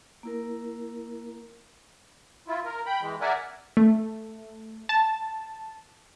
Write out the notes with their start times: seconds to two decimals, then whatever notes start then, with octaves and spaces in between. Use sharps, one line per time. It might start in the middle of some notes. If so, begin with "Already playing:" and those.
0.23 A#3 E4 A#4
2.48 E4 F4
2.65 A#4
2.86 G5 B5
3.01 E3 G#3
3.21 A#4 D5 E5 F#5 G#5
3.77 A3
4.89 A5